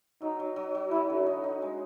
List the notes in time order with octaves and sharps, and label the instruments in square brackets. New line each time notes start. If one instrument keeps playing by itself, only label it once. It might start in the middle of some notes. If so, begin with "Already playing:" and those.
[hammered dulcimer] F#3 [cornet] D#4
[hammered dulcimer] F#3
F#3
F#3
[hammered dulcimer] F#3 [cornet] E4
[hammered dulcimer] D3
D#4
D#4
G#3